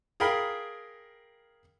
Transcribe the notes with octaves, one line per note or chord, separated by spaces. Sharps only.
G#4 A#4 F5 G5 B5